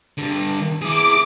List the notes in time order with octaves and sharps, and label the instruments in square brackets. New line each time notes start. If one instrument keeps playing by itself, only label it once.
[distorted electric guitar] G2 D3
[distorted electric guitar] E4 G#4 [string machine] D6